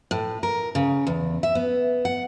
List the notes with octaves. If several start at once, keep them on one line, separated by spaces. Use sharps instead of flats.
A2
A#4
C#3
E2
E5
B3
F#5